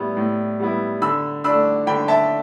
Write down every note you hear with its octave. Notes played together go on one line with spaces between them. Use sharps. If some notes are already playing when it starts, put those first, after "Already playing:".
Already playing: A2 G3 B3 E4
A2
G3 B3 E4
D3 B5 E6
A3 D4 B5 E6
D3 G5 B5
E5 A5